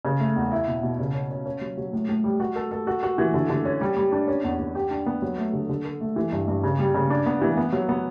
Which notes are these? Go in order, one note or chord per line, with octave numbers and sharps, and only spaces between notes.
C#3
A3
E2
E4
B2
B2
C#3
C#4
C#4
C#4
F#3
F#3
A2
A2
G3
F#4
A4
A4
F#4
F#4
E3
D3
D3
C#4
G3
G3
D4
C#4
E2
E2
G4
D4
B3
F#3
A3
D3
D3
A4
A3
E3
G2
G2
C#3
G3
C#3
D4
B3
E3
B3
F#3
B3